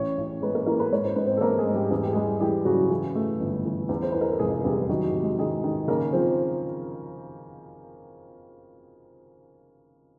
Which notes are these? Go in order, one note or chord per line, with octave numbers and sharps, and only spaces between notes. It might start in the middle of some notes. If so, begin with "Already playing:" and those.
Already playing: A1 C#4 C#5
A1
G#3 B3 B4
A#3 A#4
E3 A#3 A#4
B3 B4
G#2 C#5
C5
G#2 B4
C4 C5
A4
E3 A#3 A#4
G#3 G#4
G#2
G3 G4
E2 G#4
G4
G3 G#3 G#4
E3 G3 G4
C#3 F#3 F#4
E3
A3
G1
E3
E2
C5
E3 B4
A#4
A4
F1 G#3 G#4
E2 G3 G4
D#3 F#3 F#4
C3
G#3 G#4
D#3 G#3 G#4
D#3
C#3 A#3 A#4
F3 C4 C5